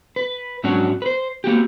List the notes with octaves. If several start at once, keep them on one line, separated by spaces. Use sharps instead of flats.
B4
G#2 F#3 C#4 D4 F#4
B4 C5
A#3 F#4 G4